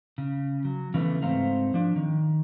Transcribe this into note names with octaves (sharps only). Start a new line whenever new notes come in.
C#3
F#3
C#3 E3 A3 B3
G#2 A3 C4 C5 F5 A#5
F3 D4
D#3